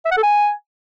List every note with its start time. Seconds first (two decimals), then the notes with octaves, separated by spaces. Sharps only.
0.06 E5
0.11 F#5
0.17 A4
0.23 G#5